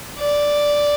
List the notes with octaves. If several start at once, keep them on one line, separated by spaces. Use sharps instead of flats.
D5